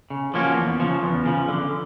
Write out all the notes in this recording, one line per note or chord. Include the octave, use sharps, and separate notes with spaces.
C#3
F3 A#3 C#4 F#4
E2
C#3 F3
E2
C#3 F3
D3